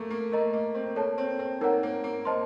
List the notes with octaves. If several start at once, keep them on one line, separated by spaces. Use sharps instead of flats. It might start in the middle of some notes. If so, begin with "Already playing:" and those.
Already playing: A3 A#3
A#3
A3 A#4 D#5 A#5
A#3
C4
A#3 A4 C#5 A5
C4
C4
A#3 D#4 A#4 C#5 F#5 A#5
A#3
A#3
C5 D#5 A5 C6